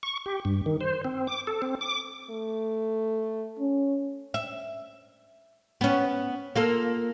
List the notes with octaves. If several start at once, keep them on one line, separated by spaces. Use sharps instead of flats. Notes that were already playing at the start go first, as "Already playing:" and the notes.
C#6
G4
G2
D#3
C5
C4
D6
A4
C4
D6
A3
C#4
E5
B3 C#4
A#3 F4 A4